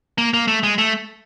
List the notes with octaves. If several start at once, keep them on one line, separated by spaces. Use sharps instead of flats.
A#3
A#3
A3
G#3
A3